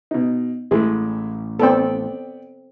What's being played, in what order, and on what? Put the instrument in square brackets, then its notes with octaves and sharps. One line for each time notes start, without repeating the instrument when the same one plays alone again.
[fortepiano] B2 D#4
[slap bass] A1 [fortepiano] G#3 A3 E4
[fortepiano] B3 D5 G5 [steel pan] C4 A4